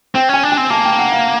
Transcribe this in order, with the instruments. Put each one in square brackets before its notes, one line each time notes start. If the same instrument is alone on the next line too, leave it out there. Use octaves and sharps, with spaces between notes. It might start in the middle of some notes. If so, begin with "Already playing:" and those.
[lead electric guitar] C4 [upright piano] G5
[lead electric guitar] C#4 [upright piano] G#5
[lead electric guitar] D4
[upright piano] G#5
[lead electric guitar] C4
[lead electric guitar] A#3 [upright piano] A5
[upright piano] G5
F#5
F5